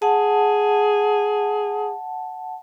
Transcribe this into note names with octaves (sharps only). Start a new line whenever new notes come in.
G#4 F#5 A5